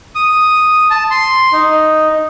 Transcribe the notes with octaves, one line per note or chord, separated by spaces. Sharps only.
D#6
A5
C6
D#4